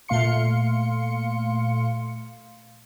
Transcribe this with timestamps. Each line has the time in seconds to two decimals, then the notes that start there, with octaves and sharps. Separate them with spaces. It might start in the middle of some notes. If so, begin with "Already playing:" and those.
0.08 A#2 A3 F5 C6 C#7